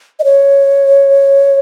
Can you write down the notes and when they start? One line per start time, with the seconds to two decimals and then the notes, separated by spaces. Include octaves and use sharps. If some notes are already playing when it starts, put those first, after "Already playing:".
0.20 D#5
0.24 C#5